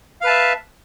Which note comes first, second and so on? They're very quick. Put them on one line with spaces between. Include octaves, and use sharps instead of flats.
F5 B4 A5 E5